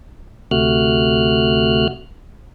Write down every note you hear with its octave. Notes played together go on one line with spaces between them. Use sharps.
D2 C3 A3 F#4 F6 F#6